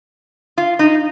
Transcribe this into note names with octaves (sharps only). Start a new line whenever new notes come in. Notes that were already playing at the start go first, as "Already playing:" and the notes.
F4
D#4